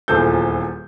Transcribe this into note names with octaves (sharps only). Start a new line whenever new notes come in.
D#1 E2 F3 A4 G6